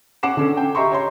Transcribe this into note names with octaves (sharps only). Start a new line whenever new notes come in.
C#4 F#5 D6 C7 E7
D3 C#4 A4
G5
G4 D#5 E5 A#5 C6 C#6
C#5 A#5 C6